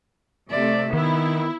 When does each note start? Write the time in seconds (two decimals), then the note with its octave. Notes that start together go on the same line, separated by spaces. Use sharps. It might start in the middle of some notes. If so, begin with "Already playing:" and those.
0.51 C3 A3 D5 E5
0.93 D#3 B3 E4